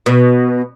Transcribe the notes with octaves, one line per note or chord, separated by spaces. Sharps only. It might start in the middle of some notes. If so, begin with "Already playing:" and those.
B2